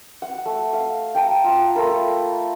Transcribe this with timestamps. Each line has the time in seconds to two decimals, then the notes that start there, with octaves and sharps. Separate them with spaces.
0.22 F#5
0.45 A3
0.73 F5
1.14 G5 A5 A#5
1.44 F4 F5
1.75 A3 F4 A#4 B5